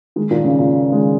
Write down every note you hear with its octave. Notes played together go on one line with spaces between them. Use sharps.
D#3 G#3
A#2 D#3
C#3
A#2
D#3 G#3